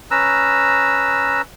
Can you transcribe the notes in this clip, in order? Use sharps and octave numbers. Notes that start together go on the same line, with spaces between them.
C#4 B4 A#5 E6